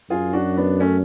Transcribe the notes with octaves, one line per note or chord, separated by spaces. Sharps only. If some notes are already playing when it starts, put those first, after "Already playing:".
F#2 F4 G#4
D4 F#4
B3 D4
A3 C#4